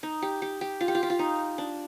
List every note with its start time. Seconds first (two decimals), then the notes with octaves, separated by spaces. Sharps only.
0.03 D#4
0.22 G4
0.42 G4
0.61 G4
0.81 F4
0.88 G4
0.95 F4
1.03 G4
1.10 F4
1.19 D#4
1.58 D4